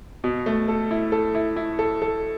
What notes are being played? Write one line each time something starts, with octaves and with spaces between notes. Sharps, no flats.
B2
A3
A4
E4
A4
E4
E4
A4
A4